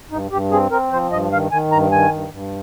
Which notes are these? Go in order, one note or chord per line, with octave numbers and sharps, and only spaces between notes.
G2 D#4
G2 G4
C4 G#4
C4 A#4
F3 C5
G2 D#5
D#3 F5
D#3 G#5
G2 A#5
D#3 G#5
G2
G2